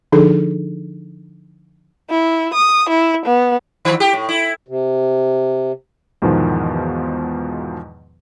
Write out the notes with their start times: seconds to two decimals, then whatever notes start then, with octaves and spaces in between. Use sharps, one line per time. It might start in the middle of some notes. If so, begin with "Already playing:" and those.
0.12 D3 F3 D4 D#4 G#4 A4
2.10 E4
2.54 D#6
2.89 E4
3.25 B3
3.85 D#3
4.00 G4
4.13 A2
4.29 E4
4.68 C3
6.22 E2 G#2 B2 D#3 F3